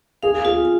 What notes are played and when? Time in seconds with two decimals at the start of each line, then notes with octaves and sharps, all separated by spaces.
0.23 G#4 F5
0.45 F4 G#4